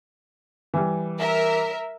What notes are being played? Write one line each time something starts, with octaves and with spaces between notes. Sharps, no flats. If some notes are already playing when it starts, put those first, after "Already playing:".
E3 G3
A#4 E5